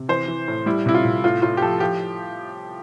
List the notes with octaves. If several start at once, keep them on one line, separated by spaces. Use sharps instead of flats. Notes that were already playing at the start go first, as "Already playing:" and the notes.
Already playing: C3
E3 C5
E3
A2
G3 E4
C3 E4
F4
C3
A2 F4
A2 F4
G4
F3 A4
F3 G4